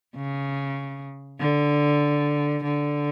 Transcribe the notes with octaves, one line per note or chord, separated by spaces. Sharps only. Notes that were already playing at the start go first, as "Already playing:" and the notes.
C#3
D3
D3